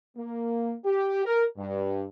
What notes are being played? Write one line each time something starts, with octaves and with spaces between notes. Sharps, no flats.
A#3
G4
A#4
G2